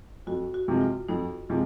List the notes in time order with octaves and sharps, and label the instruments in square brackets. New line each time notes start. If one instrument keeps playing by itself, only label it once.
[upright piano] F2 [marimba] F#4
[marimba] F#4
[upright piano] C3 F3 G#3
[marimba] F4
[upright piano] F2 [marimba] D#4
[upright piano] C3 F3 G#3